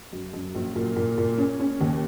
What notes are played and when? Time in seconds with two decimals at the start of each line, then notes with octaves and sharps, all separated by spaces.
0.12 F#2
0.33 F#2
0.55 A#1
0.76 A#2
0.96 A#2
1.18 A#2
1.38 C#4
1.60 C#4
1.81 D#2